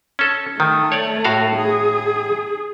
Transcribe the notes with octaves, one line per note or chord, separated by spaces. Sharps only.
C#4 A4
D#3 A3
C#5 D5
A2 F#4 F5
G#4